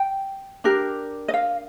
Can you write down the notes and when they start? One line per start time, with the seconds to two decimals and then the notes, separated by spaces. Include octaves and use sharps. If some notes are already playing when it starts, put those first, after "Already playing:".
Already playing: G5
0.64 D4 G4 A#4
1.28 D#5
1.34 F5